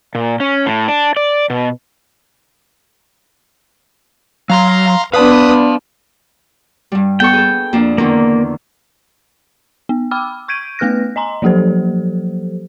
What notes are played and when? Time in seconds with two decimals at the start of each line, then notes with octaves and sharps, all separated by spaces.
0.15 A#2
0.40 C#4
0.66 A2
0.88 D4
1.17 D5
1.50 B2
4.50 F#3 F5 A#5 C6
5.14 B3 D4 B4 F5 A5 D#6
6.92 G2 G3
7.20 B3 A4 G5 C#6
7.33 G#4 A4
7.73 F2 A#3 D4
7.98 E2 D3 D#3 A#3
9.89 B3
10.11 G5 B5 D6 E6 F6
10.48 C#6 G6 G#6 D7 D#7
10.79 A3 B3 B4 F6 F#6 A#6
11.16 D#5 G#5 A#5 C6
11.42 F3 F#3 A#3 G4 A4 C5